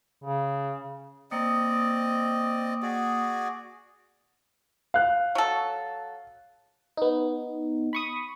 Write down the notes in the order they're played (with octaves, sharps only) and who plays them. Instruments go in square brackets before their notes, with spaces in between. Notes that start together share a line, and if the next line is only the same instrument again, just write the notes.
[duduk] C#3
[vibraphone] A#3 D#6 [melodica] C4 D5 D#5
[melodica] F#4 G#4 D5
[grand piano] F5 F#6
[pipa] F#3 A4
[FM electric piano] B3 D#4
B5 C#6 D#6